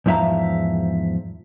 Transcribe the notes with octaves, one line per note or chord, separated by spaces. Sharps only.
E2 G#2 F3 E5 F5 A#5